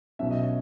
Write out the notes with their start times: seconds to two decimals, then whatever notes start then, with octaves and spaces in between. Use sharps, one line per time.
0.19 B1 B2 F#3 C#4 E5
0.31 D#5
0.42 C#5